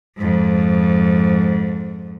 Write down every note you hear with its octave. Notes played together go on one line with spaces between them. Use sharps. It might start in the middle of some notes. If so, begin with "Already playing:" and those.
F2 G#2